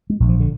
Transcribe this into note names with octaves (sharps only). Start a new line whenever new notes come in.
G#3
A#1
F3
D3